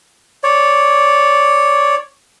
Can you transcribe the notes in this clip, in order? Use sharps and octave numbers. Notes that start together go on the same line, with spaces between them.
C#5 D5